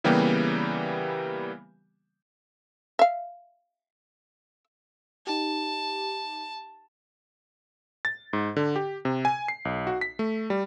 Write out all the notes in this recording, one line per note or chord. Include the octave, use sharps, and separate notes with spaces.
C#3 E3 G3 A#3 B3 G4
E5 F5
D#4 G4 A5
A6
G#2
D3
G4
C3
G#5
C7
B1
F#4
B6
A3
G3